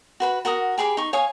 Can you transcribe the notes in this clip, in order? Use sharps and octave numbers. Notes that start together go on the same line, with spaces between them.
F#4 B4 B5
F#4 A#4 F#5 D#6
G4 G#4 B5 D6
D#4 C#6
C#5 F5 G#5 D#6